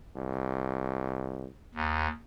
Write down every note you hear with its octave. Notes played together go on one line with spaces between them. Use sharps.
C2
D#2